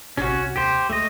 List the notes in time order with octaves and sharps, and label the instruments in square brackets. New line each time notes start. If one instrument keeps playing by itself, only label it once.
[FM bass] A1 [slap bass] C3 [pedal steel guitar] C#4 F#4
[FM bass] C2
[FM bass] D#2 [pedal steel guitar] G4 C5
[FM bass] D2 [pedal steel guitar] A3 D#5